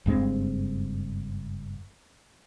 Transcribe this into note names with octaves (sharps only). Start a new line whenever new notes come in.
F#1 G2 G#3 C4